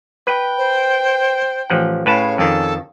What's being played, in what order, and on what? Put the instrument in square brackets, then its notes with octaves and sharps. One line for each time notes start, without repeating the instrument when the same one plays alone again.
[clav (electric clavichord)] B4 [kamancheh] G5
[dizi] C5
[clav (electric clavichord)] A1 F3 F#5
[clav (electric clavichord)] A2 B4 A5 [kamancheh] C#4 G#4 [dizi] F5
[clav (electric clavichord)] F2 D#3 [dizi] A4